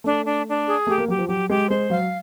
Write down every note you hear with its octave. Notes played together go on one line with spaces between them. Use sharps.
A3 D4
D4
D4
G#4
A3 G4
A#3
F#3 G4
F3
F#3 G4
G#3 G4
G#3 C5
F#3 F5